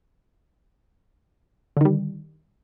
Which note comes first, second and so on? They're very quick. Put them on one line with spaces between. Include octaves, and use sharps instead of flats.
D3 D#3 G3